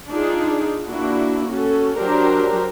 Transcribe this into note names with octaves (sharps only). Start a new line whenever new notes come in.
D4 D#4 F4 G#4
A#3 D4 E4 F#4
C#4 F#4 A4
F#3 D4 G4 A#4 C5